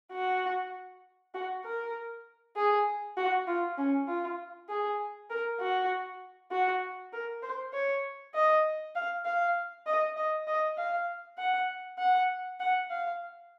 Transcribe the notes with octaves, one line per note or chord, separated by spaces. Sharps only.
F#4
F#4
A#4
G#4
F#4
F4
C#4
F4
G#4
A#4
F#4
F#4
A#4
C5
C#5
D#5
F5
F5
D#5
D#5
D#5
F5
F#5
F#5
F#5
F5